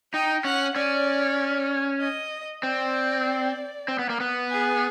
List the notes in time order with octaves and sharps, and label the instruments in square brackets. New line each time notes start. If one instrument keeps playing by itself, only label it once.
[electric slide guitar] D#4 [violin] G5
[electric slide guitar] C#4 [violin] F#5
[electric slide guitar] C#4 [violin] D5
[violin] D#5
[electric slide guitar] C4 [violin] D5
[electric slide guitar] C4
B3
A#3
B3
[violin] G#4